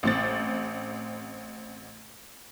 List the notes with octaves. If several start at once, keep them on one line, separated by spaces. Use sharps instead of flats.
A1 C4 A6